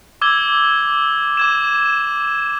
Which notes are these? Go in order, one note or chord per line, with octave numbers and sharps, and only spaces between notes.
D6 E6 G#6 G7
D6 G#6 E7